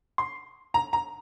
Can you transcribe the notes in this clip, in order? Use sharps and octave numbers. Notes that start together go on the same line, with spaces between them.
C6
A#5
A#5